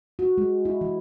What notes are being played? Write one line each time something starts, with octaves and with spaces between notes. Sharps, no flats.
F#4
G#3
E4
E3